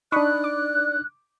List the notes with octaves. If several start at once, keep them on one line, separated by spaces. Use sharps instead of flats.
D4 D#4 D5 B5 C#6 D#6 F#6
D6